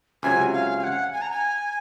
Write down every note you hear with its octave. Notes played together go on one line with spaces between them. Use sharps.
C#2 C3 F#3 G#5
F5
G#5
F#5
G#5
A#5
G#5